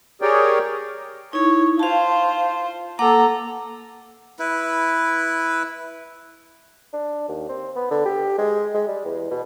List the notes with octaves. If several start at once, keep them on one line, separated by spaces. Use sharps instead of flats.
G4 G#4 A#4 C#5 D5 G5
D#4 E4 C#5
F4 C5 F5 A5
A#3 A4 F#5 A#5 D6
E4 B4
D4
D#2
C4
B3
D3
G4
G#3
G#3
G3
E2
B2